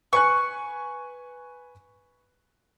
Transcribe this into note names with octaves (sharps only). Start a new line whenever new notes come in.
B4 G#5 C#6 F#6